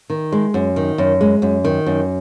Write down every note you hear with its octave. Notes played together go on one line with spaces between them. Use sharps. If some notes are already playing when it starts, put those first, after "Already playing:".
D#3
G#3
F#2
D#3
F#2
G#3
F#2
D#3
F#2